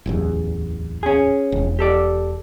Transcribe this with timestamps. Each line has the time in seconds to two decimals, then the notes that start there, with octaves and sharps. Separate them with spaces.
0.06 D1 A1 E2
1.03 C#4 G#4
1.52 E1
1.79 G4 A4 D5